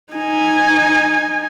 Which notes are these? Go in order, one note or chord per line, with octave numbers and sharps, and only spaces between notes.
D#4 G#5